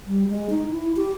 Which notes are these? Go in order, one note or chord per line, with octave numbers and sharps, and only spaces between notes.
G3
G#3
D#4
E4
G4